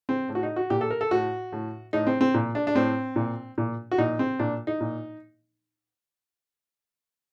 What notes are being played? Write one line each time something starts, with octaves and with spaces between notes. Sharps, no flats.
C4
A2
F#4
D#4
F#4
A#2 G4
A4
A#4
A4
A2 F#4
A2
A2 D#4
C4
C4
A#2
D4
D4
A2 C4
A#2
A#2
F#4
A#2 D#4
C4
A#2 D4
D#4
A#2